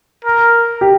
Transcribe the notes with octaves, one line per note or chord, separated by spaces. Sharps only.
A#4
G4